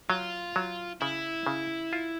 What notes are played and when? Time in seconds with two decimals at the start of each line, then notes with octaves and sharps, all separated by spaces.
0.10 F#3 F4
0.56 F#3
1.01 C#3 E4
1.47 C#3
1.93 F4